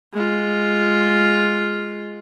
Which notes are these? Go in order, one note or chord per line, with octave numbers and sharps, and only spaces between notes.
G#3 F4